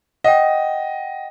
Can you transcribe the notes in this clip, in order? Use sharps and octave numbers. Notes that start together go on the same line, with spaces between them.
D#5 F#5 G5